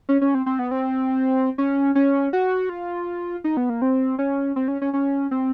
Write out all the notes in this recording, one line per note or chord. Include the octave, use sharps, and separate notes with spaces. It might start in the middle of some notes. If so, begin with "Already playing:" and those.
C#4
C#4
C4
C4
B3
C4
C#4
C#4
F#4
F4
D#4
B3
A#3
C4
C#4
C4
C#4
C#4
C#4
C4